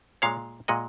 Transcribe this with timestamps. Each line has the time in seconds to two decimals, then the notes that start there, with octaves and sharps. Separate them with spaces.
0.22 A#2 G#3 C#5 F5
0.68 A#2 G#3 D#5 F#5